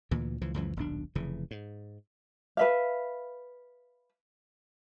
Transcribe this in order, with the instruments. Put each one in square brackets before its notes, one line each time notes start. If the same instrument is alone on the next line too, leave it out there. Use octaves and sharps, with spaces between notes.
[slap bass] D2 A#2 E3
C#2 E3 F3
C#2 F#2 E3 F3
D#1 B1 D4
F1 C#3 E3
G#2
[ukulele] B4 E5 F5